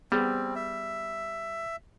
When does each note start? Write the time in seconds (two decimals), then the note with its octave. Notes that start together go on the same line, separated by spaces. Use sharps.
0.12 G3 B3 C4 G#4
0.56 E5